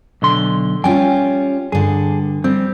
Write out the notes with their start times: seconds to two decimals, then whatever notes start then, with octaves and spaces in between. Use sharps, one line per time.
0.22 B1 D3 C6
0.84 G3 C#4 F4 G5 G#5
1.72 G2 D3 G#4
2.44 G3 C4